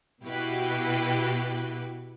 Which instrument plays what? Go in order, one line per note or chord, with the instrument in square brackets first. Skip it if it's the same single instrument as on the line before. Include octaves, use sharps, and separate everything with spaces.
[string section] B2 E4 F#4 G4 B4